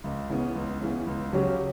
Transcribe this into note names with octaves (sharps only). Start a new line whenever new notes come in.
C#2
C#3 E3 B3
C#2
C#3 E3 B3
C#2
C#3 F#3 C#4 G4